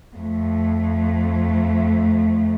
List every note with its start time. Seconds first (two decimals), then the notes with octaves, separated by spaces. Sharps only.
0.17 F2 A3